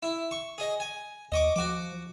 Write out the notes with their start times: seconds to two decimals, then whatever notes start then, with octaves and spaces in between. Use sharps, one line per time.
0.03 E4
0.31 C#6
0.58 G#4 D#5
0.80 G#5
1.32 D#2 D#5 C#6 D6
1.56 F3 F#4 D6